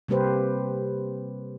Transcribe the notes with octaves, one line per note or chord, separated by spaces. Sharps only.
C3 G3 A#3 G4 B4 C5